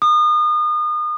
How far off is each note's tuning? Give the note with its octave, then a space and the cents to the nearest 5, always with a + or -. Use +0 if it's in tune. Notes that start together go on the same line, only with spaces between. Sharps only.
D#6 -35